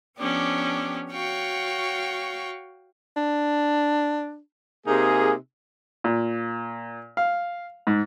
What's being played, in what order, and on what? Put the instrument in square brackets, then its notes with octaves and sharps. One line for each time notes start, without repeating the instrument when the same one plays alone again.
[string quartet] F3 B3 C#4 D4 G4
F#4 C#5 F5 G5 C#6
[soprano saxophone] D4
[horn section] C3 A#3 G#4 [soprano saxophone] D#4
[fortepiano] A#2
F5
G#2